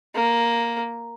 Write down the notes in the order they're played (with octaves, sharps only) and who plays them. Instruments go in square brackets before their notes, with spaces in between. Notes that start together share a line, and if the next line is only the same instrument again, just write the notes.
[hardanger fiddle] A#3